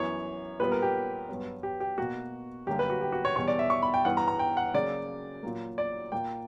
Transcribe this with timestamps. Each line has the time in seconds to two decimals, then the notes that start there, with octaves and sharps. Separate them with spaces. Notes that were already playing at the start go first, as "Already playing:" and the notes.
Already playing: F#2 E3 B3 C#5
0.60 A#2 G3 B3 B4
0.72 A#4
0.82 G4
1.29 G2 F#3 B3
1.63 G4
1.80 G4
1.98 B2 A#3 F#4
2.67 F#2 D3 G3 A#3 G4
2.79 B4
2.90 F#4
3.01 G4
3.12 F#4
3.25 C#5
3.36 E2 B2 G3 C#5
3.48 D5
3.59 E5
3.70 C#6
3.82 B5
3.94 G5
4.05 G2 E3 B3 F#5
4.17 A#5
4.28 A#5
4.39 G5
4.57 F#5
4.74 C#3 F#3 A#3 D5
5.43 A#2 F#3 A#3
5.78 D5
6.12 A#2 A#3 G5